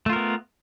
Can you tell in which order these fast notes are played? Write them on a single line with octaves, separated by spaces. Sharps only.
A3 F4 A#4 B3